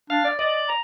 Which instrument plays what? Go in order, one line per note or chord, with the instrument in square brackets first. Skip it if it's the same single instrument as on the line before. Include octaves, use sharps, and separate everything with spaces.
[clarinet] D4 [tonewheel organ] F5
[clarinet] D5
[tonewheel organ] D5 [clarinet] D#5
[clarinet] A#5